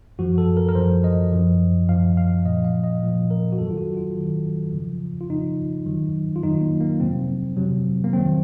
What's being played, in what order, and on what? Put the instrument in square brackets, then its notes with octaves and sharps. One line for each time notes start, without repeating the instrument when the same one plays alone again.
[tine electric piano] F#2 F3 F#4
A4
A#4
A#4
F#2 F3 C5
D#5
F#2 F3
F#2 F3 F5
F5
A#2 F3 D#5
F5
D#5
A#2 F3
A#4
F#4
F2 D#3 F#3 A4
F4
F#4
F4
F2 D#3 F#3
F2 C#3 F3
F4
F2 C#3 F3 D#4
F2 D#3 F#3
F4
F2 D#3 F#3 D#4
A#3
A#3
F2 C3 F#3 C4
F2 C3 F#3
A#3
F2 D#3 F#3 C4